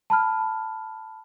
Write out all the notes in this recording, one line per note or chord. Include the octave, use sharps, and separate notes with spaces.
A5 B5 F6